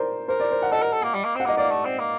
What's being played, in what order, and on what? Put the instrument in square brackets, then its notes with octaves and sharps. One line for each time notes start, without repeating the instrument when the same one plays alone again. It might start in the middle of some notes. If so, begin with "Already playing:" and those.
Already playing: [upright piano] A#4 C5 D5
[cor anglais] A#4 [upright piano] C5
[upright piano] D5
C5
F#5
[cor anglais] A4 [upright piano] D#5
[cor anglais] A#4
A4
A#3
G3
A#3
[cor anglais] C4 [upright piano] F#5
[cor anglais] A#3
[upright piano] D#5
[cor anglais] A#3 [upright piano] D5
[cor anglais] A3
C4
A#3